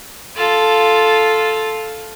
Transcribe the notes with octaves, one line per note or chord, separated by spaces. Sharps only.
F4 A4